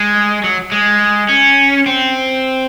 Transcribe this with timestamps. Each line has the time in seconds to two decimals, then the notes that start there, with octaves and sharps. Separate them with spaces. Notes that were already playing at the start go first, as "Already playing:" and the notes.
Already playing: G#3
0.44 F#3
0.72 G#3
1.29 C#4
1.86 C4